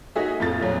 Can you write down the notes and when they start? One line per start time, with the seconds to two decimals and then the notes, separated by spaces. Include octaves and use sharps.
0.16 D#4 F#4 G#4 E5
0.40 F2 A2 F4 A4 A6
0.60 F2 A#2 F#3